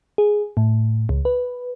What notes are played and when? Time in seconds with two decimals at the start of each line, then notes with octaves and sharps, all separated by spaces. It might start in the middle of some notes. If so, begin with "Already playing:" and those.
0.18 G#4
0.57 A2
1.09 C#2
1.25 B4